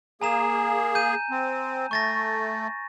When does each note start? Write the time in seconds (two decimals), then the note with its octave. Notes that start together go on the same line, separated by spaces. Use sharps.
0.22 A#3 G#4 G#5 A#5 E7
0.95 G6 D#7
1.30 C4
1.91 A3 C#6 A6 A#6